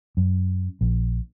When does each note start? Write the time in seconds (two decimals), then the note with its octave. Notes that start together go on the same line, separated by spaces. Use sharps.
0.17 F#2
0.81 A#1